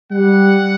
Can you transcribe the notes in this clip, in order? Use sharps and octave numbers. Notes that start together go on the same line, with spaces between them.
G3 F#5